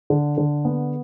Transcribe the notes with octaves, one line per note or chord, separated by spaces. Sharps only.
D3
D3
B3